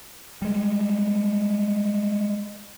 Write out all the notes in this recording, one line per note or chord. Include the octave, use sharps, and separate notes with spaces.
G3 G#3